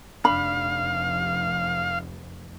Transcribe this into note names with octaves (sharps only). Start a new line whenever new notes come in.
F1 D4 F5 B5